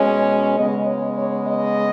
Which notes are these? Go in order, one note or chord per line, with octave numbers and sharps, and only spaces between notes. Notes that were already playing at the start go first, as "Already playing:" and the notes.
Already playing: B2 G#3 C#4
C#3 G#3 B3 D#5
C#5
C#5
D#5